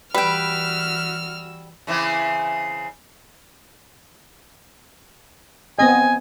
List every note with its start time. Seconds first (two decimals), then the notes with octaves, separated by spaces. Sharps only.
0.14 E3 G3 F#4 B4 G5 E6 F6
1.87 C#3 E3 C4
5.79 B3 C4 D#5 G#5